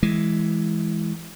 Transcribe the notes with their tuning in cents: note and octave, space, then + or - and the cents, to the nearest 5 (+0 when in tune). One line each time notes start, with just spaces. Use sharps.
E3 +0 G#3 +10